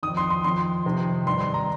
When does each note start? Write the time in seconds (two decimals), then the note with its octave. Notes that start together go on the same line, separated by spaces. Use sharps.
0.03 F2 D#3 D#6
0.17 C6
0.30 C6
0.44 F2 D#3 C6
0.85 F2 C3 D#3
1.26 G2 D#3 C6
1.41 C6
1.54 A#5